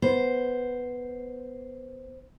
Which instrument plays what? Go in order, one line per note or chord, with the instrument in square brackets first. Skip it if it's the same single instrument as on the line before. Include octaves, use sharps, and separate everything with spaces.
[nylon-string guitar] B3 [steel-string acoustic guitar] C5